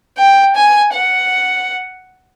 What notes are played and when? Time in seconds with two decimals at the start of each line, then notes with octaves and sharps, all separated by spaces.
0.18 G5
0.55 G#5
0.93 F#5